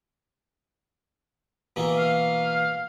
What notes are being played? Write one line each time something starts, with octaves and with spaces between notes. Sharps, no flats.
B2 E3 A#3
F5